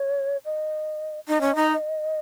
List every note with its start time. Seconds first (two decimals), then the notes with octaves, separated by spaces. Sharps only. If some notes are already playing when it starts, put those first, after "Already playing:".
Already playing: C#5
0.45 D#5
1.28 D#4 D#5
1.41 C#4
1.55 D#4